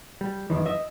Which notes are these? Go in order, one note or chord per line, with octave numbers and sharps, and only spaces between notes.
G3
F#2 A#2 D#3 E3
D#5 E5